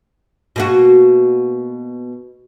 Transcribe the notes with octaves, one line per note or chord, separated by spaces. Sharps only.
B2 A#3 F#4